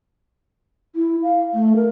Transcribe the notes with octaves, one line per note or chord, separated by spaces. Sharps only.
E4
F5
A3
A#4